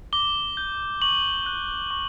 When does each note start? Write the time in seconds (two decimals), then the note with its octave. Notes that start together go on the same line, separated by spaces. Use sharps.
0.13 D6 G7
0.57 G6
1.02 C#6 F#7
1.46 F#6
1.91 C#6